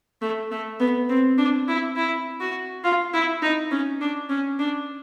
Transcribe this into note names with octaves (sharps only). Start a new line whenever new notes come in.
A3
A3
B3
C4
D4
E4
E4
F#4
F4
E4
D#4
C#4
D4
C#4
D4